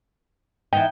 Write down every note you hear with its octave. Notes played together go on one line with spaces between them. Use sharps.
E3 B3 D#4 G5